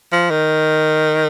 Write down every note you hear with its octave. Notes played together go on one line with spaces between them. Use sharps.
F3
D#3